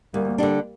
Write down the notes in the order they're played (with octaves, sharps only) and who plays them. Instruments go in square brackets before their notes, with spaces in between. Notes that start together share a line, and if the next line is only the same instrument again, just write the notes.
[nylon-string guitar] D2 [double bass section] G3 A#3
[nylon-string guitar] D3 G3 D4